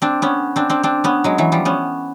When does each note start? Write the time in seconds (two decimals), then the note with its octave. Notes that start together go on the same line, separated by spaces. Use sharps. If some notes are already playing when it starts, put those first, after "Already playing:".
0.02 C4 D4
0.22 B3 C#4
0.56 C4 D4
0.70 C4 D4
0.83 C4 D4
1.04 B3 C#4
1.24 F#3 G#3
1.38 E3 F#3
1.52 F3 G3
1.65 B3 C#4